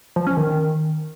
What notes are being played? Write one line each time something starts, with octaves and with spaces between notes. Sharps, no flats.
F3
C#4
D#3